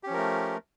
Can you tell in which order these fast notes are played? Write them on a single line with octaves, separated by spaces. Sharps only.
G4 C#4 F3 A#4 A3